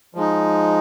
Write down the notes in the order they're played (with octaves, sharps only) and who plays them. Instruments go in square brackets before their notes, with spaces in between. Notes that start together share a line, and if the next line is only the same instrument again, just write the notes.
[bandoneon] F3 G#3 D#4